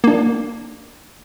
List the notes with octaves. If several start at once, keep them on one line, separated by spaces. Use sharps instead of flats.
A#3 D4